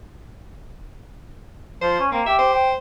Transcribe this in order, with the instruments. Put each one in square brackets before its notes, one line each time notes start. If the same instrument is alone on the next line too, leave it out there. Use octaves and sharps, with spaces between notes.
[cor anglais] F3 [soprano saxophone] C5
[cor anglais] C#4
[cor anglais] A#3 [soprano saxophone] C4
[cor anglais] G4 [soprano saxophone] E5
[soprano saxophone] C5
[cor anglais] G5